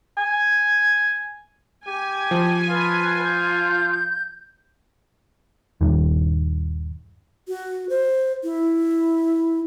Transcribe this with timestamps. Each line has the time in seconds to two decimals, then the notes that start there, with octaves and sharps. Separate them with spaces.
0.18 G#5
1.87 G4 G#5
2.31 F3
2.69 F4 B4
3.23 G6
5.81 D#1 G2 D#3
7.48 F#4
7.90 C5
8.44 E4